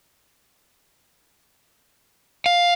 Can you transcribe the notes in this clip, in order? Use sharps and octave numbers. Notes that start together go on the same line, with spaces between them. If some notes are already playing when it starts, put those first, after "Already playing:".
F5